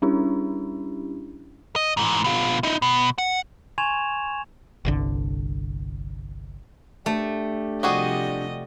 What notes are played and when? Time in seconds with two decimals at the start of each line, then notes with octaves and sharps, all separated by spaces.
0.02 G3 C#4 D4 E4 G4
1.76 D#5
1.97 G#2 E3
2.24 B2 F4
2.63 D#4 E4
2.82 B2
3.18 F#5
3.78 G#5 C6 C#6 G#6 E7 F7
4.85 G1 C2 D3
7.06 A3 D4 G4
7.83 C3 F3 G3 F#4 G#4 D#5